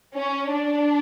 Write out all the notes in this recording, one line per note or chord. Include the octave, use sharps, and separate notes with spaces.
C#4
D4